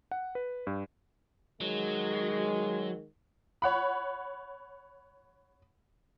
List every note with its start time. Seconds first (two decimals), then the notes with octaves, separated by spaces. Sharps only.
0.11 F#5
0.35 B4
0.67 G2
1.61 D#3 F#3 G#3
3.62 C#5 F#5 B5